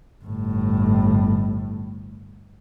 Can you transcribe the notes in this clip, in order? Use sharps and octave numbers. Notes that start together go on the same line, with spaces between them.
G1 A2